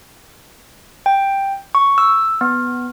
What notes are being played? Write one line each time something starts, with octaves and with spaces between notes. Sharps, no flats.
G5
C#6
E6
B3